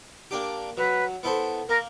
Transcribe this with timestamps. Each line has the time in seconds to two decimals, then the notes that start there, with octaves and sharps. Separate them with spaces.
0.31 A#3 D4 G4
0.77 F#3 B4
1.23 B3 E4 A4 C5
1.69 A#3 A#4